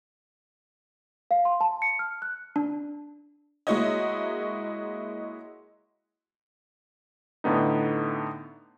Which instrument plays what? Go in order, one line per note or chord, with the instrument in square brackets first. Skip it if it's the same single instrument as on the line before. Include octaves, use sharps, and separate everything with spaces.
[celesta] F5
C6
A5
C#7
F6
F#6
[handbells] D4
[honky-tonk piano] G#3 A#3 E4 F#4 C#5 D#5
[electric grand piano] A2 D3 B3 D#4